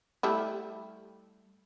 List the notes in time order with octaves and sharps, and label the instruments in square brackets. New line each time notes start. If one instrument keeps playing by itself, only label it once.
[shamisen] G3 A3 E4